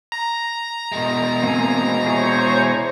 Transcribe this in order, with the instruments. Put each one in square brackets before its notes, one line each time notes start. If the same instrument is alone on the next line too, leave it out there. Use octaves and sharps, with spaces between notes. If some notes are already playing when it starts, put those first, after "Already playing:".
[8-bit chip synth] A#5
[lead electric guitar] B2 G#3
[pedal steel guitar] A#3 C4 G#5
[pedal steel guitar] E4 G#4 [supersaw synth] C5 C#5 C#6